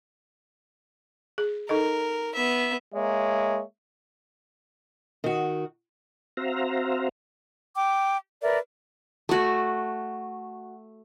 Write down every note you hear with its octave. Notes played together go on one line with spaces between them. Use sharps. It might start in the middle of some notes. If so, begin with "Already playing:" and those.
G#4
D#4 A4 A#4 D#5
B3 E5
G#3 A#3 C#5 E5
D#3 F#4
C4 F#4 C5 E5 F5 A#5
G5 D6
A#4 B4 D5 E5
A3 F#4